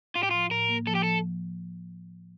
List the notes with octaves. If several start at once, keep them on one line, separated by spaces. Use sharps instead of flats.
A2 F4
G4
F3 F4
A2 A#4
A#3
F3 A4
G4
F3 A4